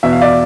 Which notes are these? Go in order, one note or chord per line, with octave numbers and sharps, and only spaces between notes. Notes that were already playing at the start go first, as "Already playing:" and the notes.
E2 B2 E5
F5
D5 E5